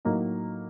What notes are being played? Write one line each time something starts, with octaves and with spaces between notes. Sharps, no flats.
A2 F#3 A#3 D#4